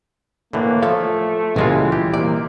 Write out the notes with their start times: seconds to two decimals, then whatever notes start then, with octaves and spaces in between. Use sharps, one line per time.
0.53 A2 D3 E3 A#3
0.83 F3 A3 A4 C#5 F5
1.56 C#2 A#2 E3 G3 G#3 F4
1.92 G4
2.14 C3 A#3 D5